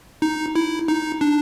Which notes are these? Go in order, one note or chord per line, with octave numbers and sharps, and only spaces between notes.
D#4
E4
D#4
D4